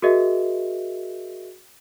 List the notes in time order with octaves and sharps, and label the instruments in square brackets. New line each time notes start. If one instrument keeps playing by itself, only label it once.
[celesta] F#4 G#4 A#4 D#5 E5